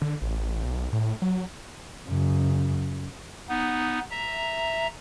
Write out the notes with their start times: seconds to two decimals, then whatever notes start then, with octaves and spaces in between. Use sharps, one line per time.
0.02 D3
0.22 A1
0.64 B1
0.92 A2
1.22 F#3
2.08 F#2 C#3
3.49 B3 D#4
4.11 E5 A#5